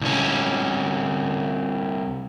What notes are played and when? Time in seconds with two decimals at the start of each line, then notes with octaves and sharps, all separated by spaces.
0.01 C2 C#4